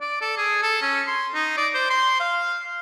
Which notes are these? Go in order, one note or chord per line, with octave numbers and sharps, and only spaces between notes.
D5
A4
G#4
A4
C#4
C6
D#4
D5
C5
C6
F5